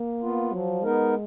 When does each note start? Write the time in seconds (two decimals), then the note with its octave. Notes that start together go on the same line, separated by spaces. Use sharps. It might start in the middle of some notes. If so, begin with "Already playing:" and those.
Already playing: A#3
0.21 B3 F4
0.52 F3 F#3
0.83 G#3 B3 D#4 A#4